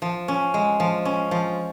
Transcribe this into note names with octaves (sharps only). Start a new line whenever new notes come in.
F3
C#4
G#3
F3
C#4
F3